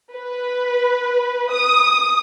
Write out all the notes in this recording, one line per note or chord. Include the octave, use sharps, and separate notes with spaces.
B4
D#6